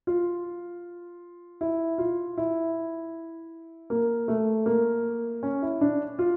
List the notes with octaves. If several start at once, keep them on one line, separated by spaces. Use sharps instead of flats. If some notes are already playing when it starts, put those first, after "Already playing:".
F4
E4
F4
E4
A#3
A3
A#3
C#4
E4
D4
F4